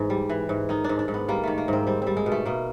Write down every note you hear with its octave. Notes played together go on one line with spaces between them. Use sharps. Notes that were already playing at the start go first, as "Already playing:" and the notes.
Already playing: G#2 E3
G3
E3
G#2
D#3 D#4
G#2 D4
D4
G#2
B3
G3 A#3
D#3 A3
A#3
G#2 C4
G3 C4
G3 C4
G#3
B2
A3
B2 A#3